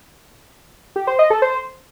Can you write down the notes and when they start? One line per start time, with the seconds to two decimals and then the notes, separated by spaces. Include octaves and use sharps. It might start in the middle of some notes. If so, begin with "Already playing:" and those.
0.96 G4
1.07 C5
1.19 D#5
1.30 A4
1.42 C5